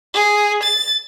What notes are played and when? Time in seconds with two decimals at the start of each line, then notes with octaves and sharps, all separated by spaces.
0.14 G#4
0.63 A6